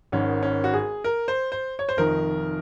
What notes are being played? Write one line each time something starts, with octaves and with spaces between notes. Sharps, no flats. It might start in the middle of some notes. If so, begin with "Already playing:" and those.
G#1 G#2 D#3 C#4
C#4
F#4
G#4
A#4
C5
C5
C#5
C5
F1 F2 D#3 A#4